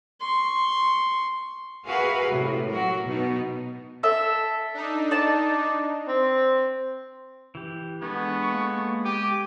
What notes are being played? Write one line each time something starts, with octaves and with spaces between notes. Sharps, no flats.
C6 C#6
F#4 G#4 A#4 B4 E5 F5
A2 C3
F#3 F#4 A#4
B2 B3 D#4
A4 E5
D4 D#4
D5 A5
C4
E3 G4
G#3 B3 D4 A4 C#6
A#3
G4 D6 D#7